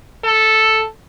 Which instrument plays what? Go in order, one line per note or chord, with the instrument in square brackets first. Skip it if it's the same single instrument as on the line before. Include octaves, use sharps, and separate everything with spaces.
[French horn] A4